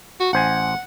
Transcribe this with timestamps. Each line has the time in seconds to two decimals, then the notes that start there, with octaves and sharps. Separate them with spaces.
0.20 F#4
0.33 A1 C5 F#5 G#5